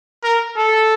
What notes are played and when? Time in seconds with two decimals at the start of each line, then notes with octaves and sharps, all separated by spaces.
0.23 A#4
0.57 A4